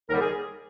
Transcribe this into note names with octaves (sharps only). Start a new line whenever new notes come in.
D#2 D3 G3 A#4
G#4